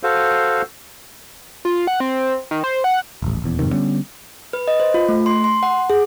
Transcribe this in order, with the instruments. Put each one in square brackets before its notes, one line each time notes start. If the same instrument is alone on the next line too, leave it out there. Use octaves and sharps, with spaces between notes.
[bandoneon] F#4 A4 C5 F5
[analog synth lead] F4
F#5
C4
D#3
C5
F#5
[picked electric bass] D#1 A1
D#1 E2
F2 G#2 C3 D#3
D3 G3 B3 C#4
[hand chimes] B4
D#5
C5
F4
A3
C6
C6
F#5
G#4